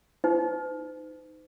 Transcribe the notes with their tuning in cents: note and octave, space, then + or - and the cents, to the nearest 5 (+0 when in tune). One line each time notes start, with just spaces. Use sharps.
D#4 +0 C5 -45